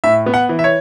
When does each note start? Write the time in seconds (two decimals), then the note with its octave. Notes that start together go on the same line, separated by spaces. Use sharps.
0.04 A2 E5
0.26 B3
0.34 F#5
0.49 E3
0.59 E5
0.64 C#5